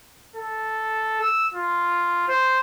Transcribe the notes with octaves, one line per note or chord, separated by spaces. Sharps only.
A4
E6
F4
C5